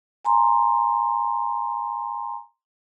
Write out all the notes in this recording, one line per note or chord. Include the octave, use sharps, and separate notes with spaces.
G#5 A#5 C6